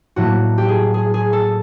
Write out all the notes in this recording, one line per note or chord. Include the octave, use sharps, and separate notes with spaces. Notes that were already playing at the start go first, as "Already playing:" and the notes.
A2 F#3 A#3 F#4
G4
G#4
G#4
G#4
A4